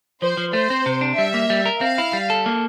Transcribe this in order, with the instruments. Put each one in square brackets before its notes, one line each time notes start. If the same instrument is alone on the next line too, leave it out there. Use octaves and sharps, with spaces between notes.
[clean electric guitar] F3 [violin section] C5
[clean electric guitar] F3
[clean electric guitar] A3 [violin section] C5
[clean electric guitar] C4
C3
D4
[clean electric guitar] G3 [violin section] E5
[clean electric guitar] A#3
G3
A#4
[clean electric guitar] C4 [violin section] F5
[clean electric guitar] E4
G3
A4
A#3